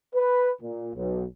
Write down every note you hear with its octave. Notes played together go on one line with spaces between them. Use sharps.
B4
A#2
B1